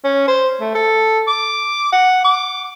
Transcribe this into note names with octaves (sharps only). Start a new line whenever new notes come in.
C#4
C5
A3
A4
D6
F#5
D6